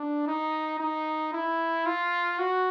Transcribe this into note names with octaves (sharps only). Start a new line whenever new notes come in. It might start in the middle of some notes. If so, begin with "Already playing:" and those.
Already playing: D4
D#4
D#4
E4
F4
F#4